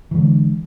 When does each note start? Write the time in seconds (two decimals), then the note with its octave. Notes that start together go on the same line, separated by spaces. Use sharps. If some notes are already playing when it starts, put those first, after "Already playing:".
0.11 E3
0.14 G#3
0.18 D3